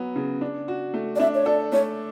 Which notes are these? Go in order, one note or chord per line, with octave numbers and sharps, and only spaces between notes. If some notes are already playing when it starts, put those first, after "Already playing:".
Already playing: F#3 B3
C#3
D4
F#4
A3
D5
D4 E5
C#5
A4 D5
A3 C#5